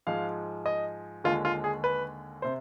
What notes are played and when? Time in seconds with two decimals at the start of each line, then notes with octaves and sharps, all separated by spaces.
0.07 G#2 F3 G#3 F5
0.66 D#5
1.24 D#2 D3 G#3 F4
1.45 F4
1.64 G#4
1.84 B4
2.42 C3 C5